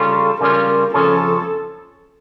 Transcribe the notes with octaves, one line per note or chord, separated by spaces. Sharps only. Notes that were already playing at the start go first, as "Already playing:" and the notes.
Already playing: C#3 G3 C#4 F4 A4
C#3 G3 C#4 F4 A#4
F2 C#3 F3 C#4 A4